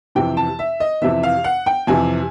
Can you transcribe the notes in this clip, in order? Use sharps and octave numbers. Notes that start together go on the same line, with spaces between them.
F2 C3 E3 G5
A5
E5
D#5
F2 C3 E3 E5
F5
F#5
G5
F2 C3 E3 G#5